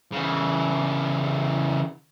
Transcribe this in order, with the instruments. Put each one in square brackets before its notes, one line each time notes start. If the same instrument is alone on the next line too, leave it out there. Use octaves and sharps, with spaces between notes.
[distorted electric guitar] C#3 E3